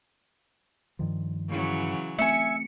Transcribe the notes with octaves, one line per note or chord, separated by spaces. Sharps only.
G2 D#3 F3
C#3 E3 F#3
A3 C4 E5 G#5 C#7